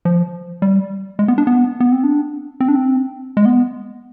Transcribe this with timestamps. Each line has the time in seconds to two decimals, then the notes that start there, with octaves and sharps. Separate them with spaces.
0.05 F3
0.62 G3
1.19 G#3
1.28 B3
1.38 D4
1.47 B3
1.80 B3
1.92 C4
2.04 D4
2.60 C4
2.68 D4
2.75 C4
3.37 G#3
3.45 B3